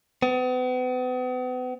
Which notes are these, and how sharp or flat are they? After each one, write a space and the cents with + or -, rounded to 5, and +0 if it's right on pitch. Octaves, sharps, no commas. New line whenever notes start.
B3 +40